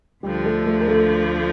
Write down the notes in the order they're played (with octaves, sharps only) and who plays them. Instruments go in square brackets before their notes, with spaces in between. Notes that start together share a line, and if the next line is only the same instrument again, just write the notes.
[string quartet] D2 D3 F3 [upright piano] G3 G4
[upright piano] A3 A4
A3 A4
A#4
A3 A4